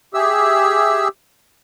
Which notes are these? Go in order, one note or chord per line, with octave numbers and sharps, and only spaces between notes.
G4 G#4 E5 E6